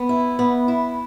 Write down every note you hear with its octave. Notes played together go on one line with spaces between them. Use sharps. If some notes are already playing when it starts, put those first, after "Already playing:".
Already playing: B3
E4
B3
E4